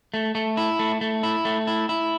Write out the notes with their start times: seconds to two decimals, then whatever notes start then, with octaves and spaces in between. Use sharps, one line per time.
0.14 A3
0.35 A3
0.57 E4
0.79 A3
1.01 A3
1.23 E4
1.45 A3
1.67 E4
1.89 E4